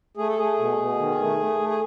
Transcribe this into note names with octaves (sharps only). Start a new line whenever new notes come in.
A3 G#4
A4
A3 G#4
B2
B2
D#3
A3
A3
A3
G#4